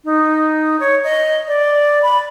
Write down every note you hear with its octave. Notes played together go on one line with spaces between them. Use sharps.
D#4
C#5
D#5
D5
B5